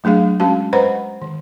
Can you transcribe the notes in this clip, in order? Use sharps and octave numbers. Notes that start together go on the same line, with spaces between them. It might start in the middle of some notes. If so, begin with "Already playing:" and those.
F#3 A3 D4 G#4 F5
G#3 C#4 F#4 F5 A5
B4 C5 D#5 F#5 A#5 B5
D#3